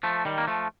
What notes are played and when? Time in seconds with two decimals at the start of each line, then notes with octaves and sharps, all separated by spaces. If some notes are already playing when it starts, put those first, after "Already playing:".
0.03 F3 A3
0.25 D#3 G3
0.38 A#3
0.47 F3 A3